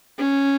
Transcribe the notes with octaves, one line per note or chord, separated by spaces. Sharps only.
C#4